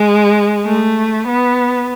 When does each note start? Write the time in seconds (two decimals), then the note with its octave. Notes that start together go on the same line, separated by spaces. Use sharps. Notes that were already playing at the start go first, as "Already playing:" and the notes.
Already playing: G#3
0.65 A3
1.27 B3